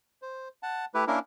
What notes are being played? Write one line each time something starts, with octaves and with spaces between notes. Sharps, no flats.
C5
F#5 A5
A3 E4 G4 B4
A#3 C#4 D4 E4 A#4